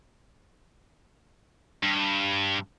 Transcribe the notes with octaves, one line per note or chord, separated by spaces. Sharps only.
G2